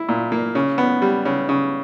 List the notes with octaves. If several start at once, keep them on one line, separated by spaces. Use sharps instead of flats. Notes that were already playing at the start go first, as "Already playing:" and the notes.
Already playing: E4
A#2
A#3
C#3
B3
G3
C#3
C#3